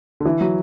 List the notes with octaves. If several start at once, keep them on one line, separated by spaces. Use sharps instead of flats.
D3
E3
F#3